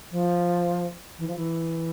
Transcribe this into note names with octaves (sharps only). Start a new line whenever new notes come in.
F3
E3
F3
E3